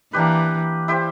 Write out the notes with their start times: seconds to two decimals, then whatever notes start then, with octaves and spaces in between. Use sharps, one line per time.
0.13 E3 A#3 D4 G4 B4
0.88 E4 G4 C5